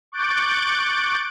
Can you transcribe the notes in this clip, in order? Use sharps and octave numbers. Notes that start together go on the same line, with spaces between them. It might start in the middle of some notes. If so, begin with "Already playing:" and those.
C#6 D6 F#6 G6 A6 D7